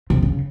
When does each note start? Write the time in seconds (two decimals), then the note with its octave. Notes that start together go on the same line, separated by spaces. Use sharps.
0.10 C3
0.22 C#3